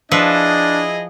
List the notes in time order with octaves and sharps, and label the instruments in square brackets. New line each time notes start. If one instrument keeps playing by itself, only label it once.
[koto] F3 B4 E5 [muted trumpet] D4 [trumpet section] E4 G#4 D#5